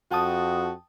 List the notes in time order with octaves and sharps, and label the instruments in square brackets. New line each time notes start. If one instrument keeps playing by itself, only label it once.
[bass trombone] F2 [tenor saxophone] F#4 [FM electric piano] G5 A5 D#6